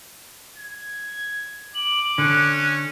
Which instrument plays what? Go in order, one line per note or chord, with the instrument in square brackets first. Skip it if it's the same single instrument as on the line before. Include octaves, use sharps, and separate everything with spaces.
[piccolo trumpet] G#6
[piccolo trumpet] D6 [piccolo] F#7
[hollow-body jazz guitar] D3 [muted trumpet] C#4 [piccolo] F#6